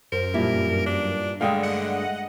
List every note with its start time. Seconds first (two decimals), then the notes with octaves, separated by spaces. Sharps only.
0.12 F#2 A#4 C5
0.34 G2 A#2 F3 G3 E4
0.87 D4
1.41 G2 D3 G#3 A3 F5 G5 D#6
1.63 D#5 F#5 C#7